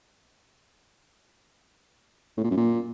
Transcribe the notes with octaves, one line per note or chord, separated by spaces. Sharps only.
A2
A#2
F#2
A#2